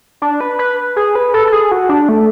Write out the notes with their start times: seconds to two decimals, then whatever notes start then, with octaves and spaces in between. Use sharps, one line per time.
0.22 D4
0.41 B4
0.59 B4
0.96 G#4
1.15 B4
1.34 A4
1.47 A4
1.53 G#4
1.72 F#4
1.89 D4
2.09 A3